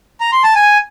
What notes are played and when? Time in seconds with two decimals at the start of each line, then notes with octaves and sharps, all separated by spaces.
0.21 A#5
0.32 C6
0.44 A5
0.55 G#5